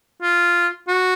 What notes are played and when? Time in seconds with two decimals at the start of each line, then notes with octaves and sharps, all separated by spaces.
0.22 F4
0.88 F#4